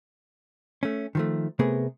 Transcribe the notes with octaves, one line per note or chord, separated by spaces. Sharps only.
A3 C#4
D#3 F3 A3
C3 A3 B3 G#4 A#4